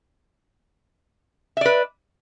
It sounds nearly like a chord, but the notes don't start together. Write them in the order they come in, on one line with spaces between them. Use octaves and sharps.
E5 D5 B4